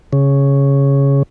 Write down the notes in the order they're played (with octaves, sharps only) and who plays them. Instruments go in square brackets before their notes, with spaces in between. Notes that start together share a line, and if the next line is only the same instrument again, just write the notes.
[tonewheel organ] C#3